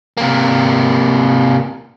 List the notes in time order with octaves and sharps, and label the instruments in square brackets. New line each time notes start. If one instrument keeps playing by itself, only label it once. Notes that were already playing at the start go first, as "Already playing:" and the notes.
[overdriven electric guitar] C3 A#3